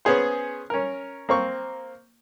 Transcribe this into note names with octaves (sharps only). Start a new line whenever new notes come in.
B3 C#4 G#4 C5
C#4 A#4
A#3 C4 C#6